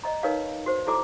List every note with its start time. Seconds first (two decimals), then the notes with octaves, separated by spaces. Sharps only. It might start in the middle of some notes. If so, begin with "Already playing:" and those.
0.04 D5 D#5 A#5
0.23 D#4 A#4 B4 C#5 D5 F5
0.66 F#4 C5
0.87 E4 F#4 A4 D5 A#5 D6